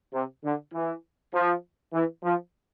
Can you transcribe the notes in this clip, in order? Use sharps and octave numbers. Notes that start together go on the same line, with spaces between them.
C3
D3
E3
F3
E3
F3